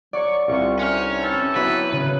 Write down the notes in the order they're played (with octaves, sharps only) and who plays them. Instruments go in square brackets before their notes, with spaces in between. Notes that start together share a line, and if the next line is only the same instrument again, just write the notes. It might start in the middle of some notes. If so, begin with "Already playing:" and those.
[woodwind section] F#3 C#6 [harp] D5
[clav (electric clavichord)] C2 C3 [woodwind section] F4 C#6
[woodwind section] D3 D#4 F6 [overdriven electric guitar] C#4 C#5
[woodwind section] E3 C4 A4
[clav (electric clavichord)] F#3 B3 E4 [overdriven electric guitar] B4
[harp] C#3